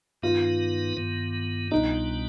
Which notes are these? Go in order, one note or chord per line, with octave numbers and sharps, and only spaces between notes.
G2 D#3 B3 D#4 F4 B4
G2 D#3 B3
C2 B2 G3 B3 D4 D#4